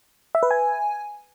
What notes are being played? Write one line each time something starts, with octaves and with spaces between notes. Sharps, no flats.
E5
B4
G#5